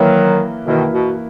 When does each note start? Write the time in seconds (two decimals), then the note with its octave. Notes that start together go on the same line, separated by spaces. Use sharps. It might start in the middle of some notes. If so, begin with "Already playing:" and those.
Already playing: D#3 E3 F#3 A#3 E4 B4
0.66 B2 D#3 E3 A#3 E4 B4
0.92 B2